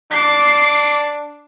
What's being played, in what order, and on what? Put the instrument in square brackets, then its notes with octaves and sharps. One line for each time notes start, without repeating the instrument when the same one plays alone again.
[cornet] D4 [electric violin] D6 C7